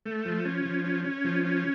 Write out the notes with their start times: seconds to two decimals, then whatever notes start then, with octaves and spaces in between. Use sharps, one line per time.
0.06 A3
0.25 F3
0.45 C#4
0.65 F3
0.84 C#4
1.04 C#4
1.25 F3
1.45 C#4